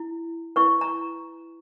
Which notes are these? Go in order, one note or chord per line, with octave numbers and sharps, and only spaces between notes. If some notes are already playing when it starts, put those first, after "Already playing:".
Already playing: E4
E4 B4 C#6
A#5